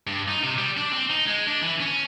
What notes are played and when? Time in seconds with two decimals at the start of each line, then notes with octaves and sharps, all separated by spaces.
0.07 G2
0.28 D#4
0.43 C3
0.58 G3
0.77 D4
0.93 C4
1.10 D#4
1.27 G#3
1.47 D4
1.62 E3
1.80 C#4